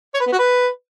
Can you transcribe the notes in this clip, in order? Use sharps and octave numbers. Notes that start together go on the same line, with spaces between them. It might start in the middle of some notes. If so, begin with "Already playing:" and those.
C#5
B4
B3
F#4
B4